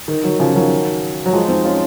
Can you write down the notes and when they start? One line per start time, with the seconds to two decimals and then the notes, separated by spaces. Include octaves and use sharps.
0.08 D#3
0.24 D#3 F#3
0.39 C#3 F3
0.55 D#3 F#3
1.26 F#3
1.33 F3 G#3
1.49 C4 D#4
1.65 C#4 F4